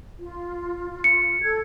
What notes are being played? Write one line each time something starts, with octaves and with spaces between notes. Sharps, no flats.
F4
C#7
A4 G#6